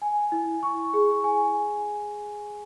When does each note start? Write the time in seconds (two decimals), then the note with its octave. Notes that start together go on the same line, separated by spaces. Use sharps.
0.02 G#5
0.32 E4
0.63 C#6
0.94 G#4
1.24 G#5